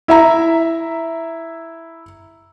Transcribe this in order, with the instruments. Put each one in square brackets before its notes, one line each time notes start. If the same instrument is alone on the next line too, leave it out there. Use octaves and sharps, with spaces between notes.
[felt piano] E4 E5 A#5